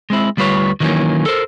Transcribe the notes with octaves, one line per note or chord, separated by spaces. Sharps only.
G#3 C4 E4
D2 G3 F4 B4 C#5
D#3 E3 F#3 A3 A#3 C#4
A4 A#4 C5